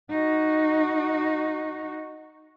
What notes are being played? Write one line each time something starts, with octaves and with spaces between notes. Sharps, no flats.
D#4 F#4